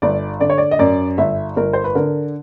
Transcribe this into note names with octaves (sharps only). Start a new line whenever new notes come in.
G1 D5
D3 D5
C#5
D5
D#5
F#2 D5
G1 E5
G1 A#4
C5
B4
D3 A#4